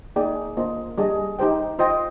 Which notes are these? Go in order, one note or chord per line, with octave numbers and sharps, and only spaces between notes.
A#3 D#4 G#4 D5 G5
A#3 D4 F4 C5 D#5
G3 D4 G#4 D#5
D#4 G4 C5 G5
F4 C5 D#5 G5